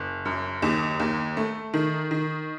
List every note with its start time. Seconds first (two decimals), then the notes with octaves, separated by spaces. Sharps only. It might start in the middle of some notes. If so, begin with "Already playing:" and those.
Already playing: F#1
0.25 F#2
0.62 D#2
1.00 D#2
1.37 A3
1.74 D#3
2.11 D#3